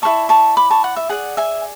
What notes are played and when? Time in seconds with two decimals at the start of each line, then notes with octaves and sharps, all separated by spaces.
0.02 E4 B4 D5 A5 C#6
0.29 A5 C#6
0.57 B5 D6
0.70 A5 C#6
0.84 F#5
0.96 E5
1.09 G#4 D5 F#5
1.37 E5 G#5